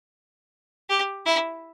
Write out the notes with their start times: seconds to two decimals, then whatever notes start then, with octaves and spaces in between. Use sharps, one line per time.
0.89 G4
1.26 E4